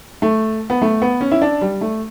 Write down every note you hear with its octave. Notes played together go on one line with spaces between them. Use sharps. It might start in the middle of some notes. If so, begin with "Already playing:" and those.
A3
B3
A3
B3
C#4
E4
D4
G3
A3